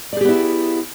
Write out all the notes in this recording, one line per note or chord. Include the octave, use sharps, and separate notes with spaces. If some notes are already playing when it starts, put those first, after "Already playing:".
B3 E4 G4 G#4 D5